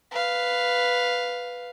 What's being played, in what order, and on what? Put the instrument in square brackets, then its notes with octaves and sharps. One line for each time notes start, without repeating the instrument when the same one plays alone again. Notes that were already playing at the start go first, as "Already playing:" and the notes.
[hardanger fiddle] B4 F5